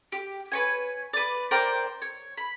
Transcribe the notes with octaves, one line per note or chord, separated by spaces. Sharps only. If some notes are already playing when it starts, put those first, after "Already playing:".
G4
B4 C#5 G#5
B4 D5
A#4 C5 D5 G5
C#5
B5